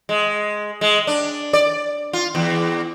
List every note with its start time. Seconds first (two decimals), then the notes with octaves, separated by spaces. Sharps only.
0.09 G#3
0.81 G#3
1.07 D4
1.53 D5
2.13 F4
2.35 E2